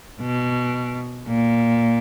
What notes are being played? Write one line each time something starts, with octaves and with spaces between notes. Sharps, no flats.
B2
A#2